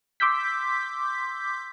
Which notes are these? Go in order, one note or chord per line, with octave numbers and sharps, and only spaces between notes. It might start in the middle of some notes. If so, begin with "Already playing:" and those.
C6 D6 E6 G6 B6